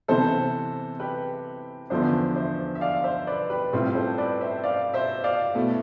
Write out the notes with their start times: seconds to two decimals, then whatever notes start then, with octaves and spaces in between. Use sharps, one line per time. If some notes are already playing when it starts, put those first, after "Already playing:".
0.08 C3 E3 B3 E4 A4 C5
1.00 G4 B4
1.90 E2 D3 F3 B3 D4 C5 E5
2.36 C5 E5
2.75 E5
2.81 D5 F5
3.04 C5 E5
3.27 B4 D5
3.50 G4 B4
3.73 A2 G3 C4 F4
3.95 A4 C5
4.18 B4 D5
4.41 C5 E5
4.64 D5 F5
4.94 C5 E5
5.24 D5 F5
5.55 B2 A3 E4